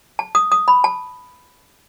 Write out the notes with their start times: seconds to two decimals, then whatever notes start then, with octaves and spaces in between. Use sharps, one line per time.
0.19 A5
0.35 D#6
0.52 D#6
0.68 B5
0.84 A5